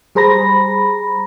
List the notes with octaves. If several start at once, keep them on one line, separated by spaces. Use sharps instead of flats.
G3 G#4 C5 A#5 B5 A#6